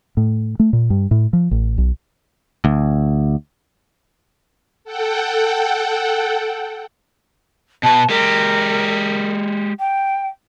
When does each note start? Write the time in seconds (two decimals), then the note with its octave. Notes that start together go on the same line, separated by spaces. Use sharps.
0.17 A2
0.60 A3
0.73 A#2
0.90 G2
1.11 A2
1.33 F3
1.51 A1
1.78 B1
2.65 D2
4.84 A4 F#5 G5
7.83 B2 B4 A5
8.09 G#3 G4 A#4
9.79 G5